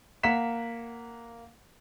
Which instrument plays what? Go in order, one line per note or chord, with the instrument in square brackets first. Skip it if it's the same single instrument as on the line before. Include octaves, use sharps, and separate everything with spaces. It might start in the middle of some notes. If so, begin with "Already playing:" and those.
[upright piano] A#3 F#5 B6 E7